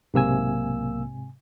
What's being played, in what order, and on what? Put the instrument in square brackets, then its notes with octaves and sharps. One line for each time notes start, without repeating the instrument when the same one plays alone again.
[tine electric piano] B1 A#3 E6 [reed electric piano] G#2 C3 G#5